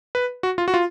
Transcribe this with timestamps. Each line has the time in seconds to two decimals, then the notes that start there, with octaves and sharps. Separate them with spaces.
0.15 B4
0.43 F#4
0.58 F4
0.68 F#4
0.74 F4